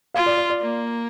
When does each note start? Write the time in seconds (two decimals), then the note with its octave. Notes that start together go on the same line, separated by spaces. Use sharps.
0.14 F4 F5
0.26 D5
0.37 D5
0.50 D5
0.60 A#3